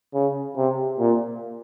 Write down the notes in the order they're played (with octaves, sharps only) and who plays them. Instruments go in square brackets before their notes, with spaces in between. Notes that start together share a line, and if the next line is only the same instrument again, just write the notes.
[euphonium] C#3
C3
A#2